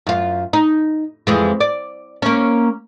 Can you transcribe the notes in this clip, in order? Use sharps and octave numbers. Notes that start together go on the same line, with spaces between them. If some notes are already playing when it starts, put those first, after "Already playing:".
F#2 F4
D#4
F2 E3 G#3
D5
A#3 C#4